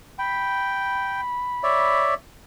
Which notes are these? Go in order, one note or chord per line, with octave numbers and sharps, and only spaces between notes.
G5 B5
C#5 D5 E5